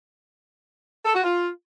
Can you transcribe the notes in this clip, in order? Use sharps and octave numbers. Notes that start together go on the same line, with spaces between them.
A4
F#4
F4